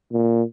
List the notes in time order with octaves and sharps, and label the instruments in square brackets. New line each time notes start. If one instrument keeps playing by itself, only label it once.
[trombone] A#2